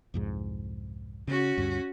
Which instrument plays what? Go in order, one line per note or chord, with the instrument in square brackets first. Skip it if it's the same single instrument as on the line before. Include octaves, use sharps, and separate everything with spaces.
[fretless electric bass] C2 F2 G#2
[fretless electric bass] C#3 [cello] C#4 F#4
[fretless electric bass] D2 G2